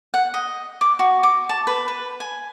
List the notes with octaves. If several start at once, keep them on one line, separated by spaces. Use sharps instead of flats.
F#5
D#5
D6
F#4
D6
A5
B4
B4
G#5